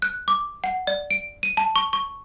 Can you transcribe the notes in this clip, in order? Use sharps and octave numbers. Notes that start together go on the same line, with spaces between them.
F#6
D6
F#5
D5
D7
D#7
A5
C#6
C#6